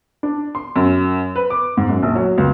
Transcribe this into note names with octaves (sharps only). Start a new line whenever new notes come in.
D4
C6
F#2
B4
D6
G#2
F#2
A#1
F#3
C#2